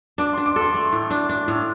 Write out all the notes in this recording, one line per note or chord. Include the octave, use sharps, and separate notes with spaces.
D4 D6
D4 C6
D6
A4 C6
A3
A2
D4
D4
A2